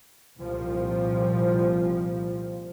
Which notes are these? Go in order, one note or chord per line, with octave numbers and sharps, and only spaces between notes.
C2 A#2 F3 G3